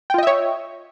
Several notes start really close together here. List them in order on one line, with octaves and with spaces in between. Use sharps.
G5 F4 D#5 E5 C#5